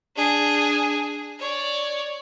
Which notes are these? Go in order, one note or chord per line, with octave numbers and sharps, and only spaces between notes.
D4 G#4
C#5 D5